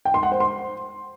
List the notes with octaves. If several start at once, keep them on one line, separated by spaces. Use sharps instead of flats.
G5
C6
F#5
C5
C6